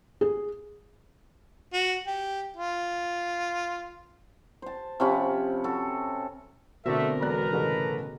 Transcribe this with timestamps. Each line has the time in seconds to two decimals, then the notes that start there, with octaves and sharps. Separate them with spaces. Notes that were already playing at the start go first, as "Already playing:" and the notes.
0.21 G#4
1.73 F#4
2.07 G4
2.57 F4
4.62 C5 A5
5.00 C3 F3 C#4 B5
5.64 F#4 A4
6.86 B2 D3 A3 C4 F#4 A#4 D5 E5
7.22 E1 A4 B4 D5 A#5 F#6
7.52 A1 C#3